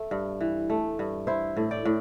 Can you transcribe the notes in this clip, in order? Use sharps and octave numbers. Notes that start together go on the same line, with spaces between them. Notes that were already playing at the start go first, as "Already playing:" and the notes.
Already playing: A3 A4
G2
E3
A3
G2
E4 C5 E5
A2
D5 G5
A2